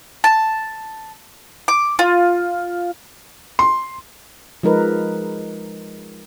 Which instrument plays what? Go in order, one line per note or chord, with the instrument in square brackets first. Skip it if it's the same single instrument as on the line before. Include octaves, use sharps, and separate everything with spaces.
[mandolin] A5
D6
F4
[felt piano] C6
[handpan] F3 G#3 D#4 A#4 B4